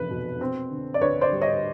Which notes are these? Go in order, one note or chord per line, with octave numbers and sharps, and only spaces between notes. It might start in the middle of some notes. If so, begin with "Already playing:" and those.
Already playing: F1 E2 B4
B2
C4
D3
D5
D2 B4 C#5
C5 D5
G3
C#5 D#5